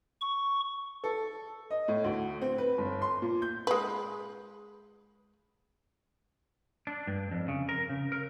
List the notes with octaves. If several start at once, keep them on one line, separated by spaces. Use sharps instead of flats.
C#6
A4
D#5
A2
D2
C4
B4
G1
C6
A#2
G6
G#3 B4
D4
G2
F2
C#3
A#4
C#3
A#4